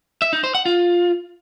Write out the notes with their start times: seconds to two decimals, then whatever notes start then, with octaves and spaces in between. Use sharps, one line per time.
0.22 E5
0.33 D#4
0.44 C5
0.55 F#5
0.66 F4